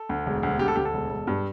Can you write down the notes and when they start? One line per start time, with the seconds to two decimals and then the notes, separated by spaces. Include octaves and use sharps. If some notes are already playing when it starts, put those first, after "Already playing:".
Already playing: A4
0.09 D2
0.26 E1
0.43 D2
0.59 D2 G4
0.68 A4
0.76 D2 G4
0.85 A4
0.94 E1
1.10 E1
1.27 G2